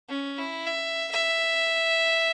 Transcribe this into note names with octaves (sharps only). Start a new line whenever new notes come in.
C#4
E4
E5
E5